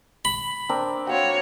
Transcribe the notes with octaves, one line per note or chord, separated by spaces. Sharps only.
B5
C4 D4 A#4
C4 F#4 C#5 F5 G5